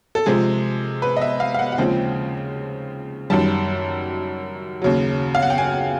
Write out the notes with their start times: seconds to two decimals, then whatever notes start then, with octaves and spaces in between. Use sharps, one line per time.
0.15 A4
0.26 C3 F3 G#3 G#4
1.02 B4
1.17 D#5
1.21 E5
1.40 F5
1.54 F5
1.59 F#5
1.72 F#5
1.78 D#2 C#3 F3 G#3 C4 G5
3.30 F#2 D#3 G3 A5
4.82 D#2 C#3 F#3
5.35 F5
5.42 F#5
5.50 G5
5.58 G#5